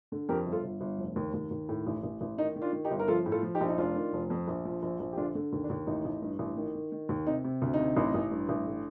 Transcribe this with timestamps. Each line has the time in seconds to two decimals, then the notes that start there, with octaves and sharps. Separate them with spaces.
0.12 D3
0.29 F2 G4 A#4
0.46 G1
0.52 F4 A4
0.64 G1
0.81 G1
0.98 F1
1.16 D#2
1.34 D#2
1.51 D#2
1.69 A2
1.87 A1
2.03 A1
2.21 A1
2.38 D#3 D#4
2.56 D#3
2.61 D4 F4
2.73 D#3
2.85 D#4 G4
2.91 G1
2.99 A#4
3.08 F3 F4 A4
3.26 A2
3.32 F4 A4
3.43 F3
3.55 D#4 G4
3.61 A#1
3.69 D#4
3.78 F1 D4 F4
3.95 D#3
4.13 F1
4.30 F2
4.48 A#1
4.65 F3
4.83 A#1
5.00 A#1
5.13 G4
5.17 D3 D4 F4
5.35 D3
5.53 D#2
5.64 D4
5.70 D#2
5.87 A1 D#4
6.05 A1
6.22 G2
6.39 A1
6.57 D#3
6.75 D#3
6.92 D#3
7.09 D#2
7.27 C3 D#4
7.44 C3
7.62 D2
7.74 D#4
7.79 C3
7.97 A1
8.14 A1
8.31 G2
8.49 A1
8.67 D3